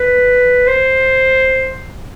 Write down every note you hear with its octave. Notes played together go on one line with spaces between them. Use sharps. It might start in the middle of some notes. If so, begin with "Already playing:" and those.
Already playing: B4
C5